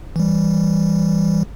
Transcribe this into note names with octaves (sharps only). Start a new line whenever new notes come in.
E3 G3